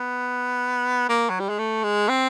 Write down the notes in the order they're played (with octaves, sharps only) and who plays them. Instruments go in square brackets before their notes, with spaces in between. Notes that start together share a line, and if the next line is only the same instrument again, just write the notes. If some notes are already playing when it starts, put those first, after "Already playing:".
Already playing: [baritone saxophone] B3
A#3
F#3
G3
G#3
A3
G#3
C4